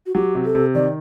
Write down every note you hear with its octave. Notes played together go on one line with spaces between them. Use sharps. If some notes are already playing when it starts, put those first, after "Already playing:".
F#4
F#3 G4
C3
A4
C3
D#3 D5